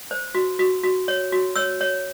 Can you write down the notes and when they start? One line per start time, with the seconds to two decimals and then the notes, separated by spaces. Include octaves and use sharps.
0.11 C5
0.35 F#4
0.59 F#4
0.84 F#4
1.08 C#5
1.32 F#4
1.56 C#5 E6
1.81 C#5